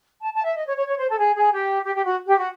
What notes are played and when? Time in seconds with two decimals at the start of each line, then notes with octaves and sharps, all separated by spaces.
0.22 A5
0.34 A5
0.44 E5
0.56 D#5
0.66 C#5
0.76 C#5
0.86 C#5
0.98 C5
1.08 A4
1.19 G#4
1.35 G#4
1.52 G4
1.83 G4
1.95 G4
2.06 F#4
2.27 G4
2.38 F#4